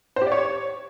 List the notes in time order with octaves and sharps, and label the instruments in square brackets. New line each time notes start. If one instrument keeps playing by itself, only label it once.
[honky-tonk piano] C5
G4
D5
C#5